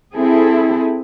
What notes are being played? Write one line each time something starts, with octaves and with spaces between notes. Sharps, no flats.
C4 E4 G#4 A4